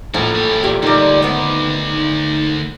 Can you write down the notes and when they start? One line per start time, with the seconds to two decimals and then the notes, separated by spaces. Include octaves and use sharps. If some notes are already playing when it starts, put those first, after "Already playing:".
0.14 A#1 A2 F#4 A#4
0.35 G3 C#5
0.63 E2 A#2 G4
0.83 D2 A#2 G3 D#4 D6
1.22 D#3 B3